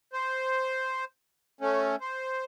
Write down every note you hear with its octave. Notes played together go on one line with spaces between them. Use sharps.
C5
A3 C#4
C5